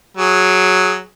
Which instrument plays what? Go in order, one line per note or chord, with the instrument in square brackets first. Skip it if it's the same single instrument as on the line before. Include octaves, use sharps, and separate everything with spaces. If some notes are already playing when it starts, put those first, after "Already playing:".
[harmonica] F#3 G#4